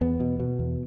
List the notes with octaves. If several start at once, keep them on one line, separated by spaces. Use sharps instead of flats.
E2 B3
B2
B2
E2